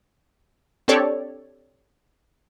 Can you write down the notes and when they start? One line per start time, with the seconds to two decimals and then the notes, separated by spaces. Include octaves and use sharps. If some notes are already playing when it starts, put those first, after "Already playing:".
0.88 C4 D4 G4 A4 C#5 D5